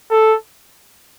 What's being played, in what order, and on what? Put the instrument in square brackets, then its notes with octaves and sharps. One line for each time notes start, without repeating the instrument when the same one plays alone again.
[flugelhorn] A4